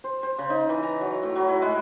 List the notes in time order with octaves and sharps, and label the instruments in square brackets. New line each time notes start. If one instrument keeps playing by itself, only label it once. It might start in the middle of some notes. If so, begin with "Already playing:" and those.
[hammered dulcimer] C5
C5
C#3
D#4
E3
A#5
F#3
A2
F#3
E4
G#3